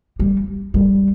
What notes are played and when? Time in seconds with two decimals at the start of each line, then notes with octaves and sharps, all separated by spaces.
0.19 G3
0.74 G3